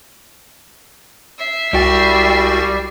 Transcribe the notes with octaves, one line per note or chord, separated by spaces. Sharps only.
E5 C7
C2 G3 F#4 G5 A6